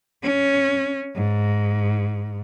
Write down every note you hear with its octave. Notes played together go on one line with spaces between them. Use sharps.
C#4
G#2